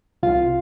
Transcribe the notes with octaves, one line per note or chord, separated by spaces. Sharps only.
C2 F4 F5